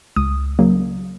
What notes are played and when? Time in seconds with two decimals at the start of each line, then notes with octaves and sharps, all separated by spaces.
0.16 C#2 D#6
0.59 C#3 F#3 A#3